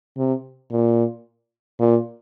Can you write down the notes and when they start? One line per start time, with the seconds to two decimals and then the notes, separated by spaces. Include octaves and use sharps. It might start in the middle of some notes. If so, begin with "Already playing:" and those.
0.17 C3
0.71 A#2
1.80 A#2